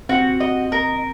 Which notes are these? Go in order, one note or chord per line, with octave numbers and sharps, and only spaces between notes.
C4 F#4
D#5
A#4